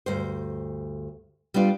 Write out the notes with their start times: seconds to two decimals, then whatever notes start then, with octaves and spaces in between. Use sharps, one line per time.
0.06 D2 G2 C5
1.54 G3 B3 D4 F4